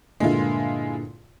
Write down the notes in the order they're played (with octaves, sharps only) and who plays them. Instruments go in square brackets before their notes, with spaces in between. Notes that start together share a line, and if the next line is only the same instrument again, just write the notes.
[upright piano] G2 A#2 D3 [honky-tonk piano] G#3 E4 F4